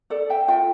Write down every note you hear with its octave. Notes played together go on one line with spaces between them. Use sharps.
A4 D5
E5 G5
F4 E5 G5